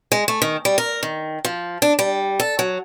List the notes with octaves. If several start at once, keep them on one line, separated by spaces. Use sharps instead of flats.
G#3
A3
D#3
G3
A#4
D#3
F3
D4
G3
A4
F#3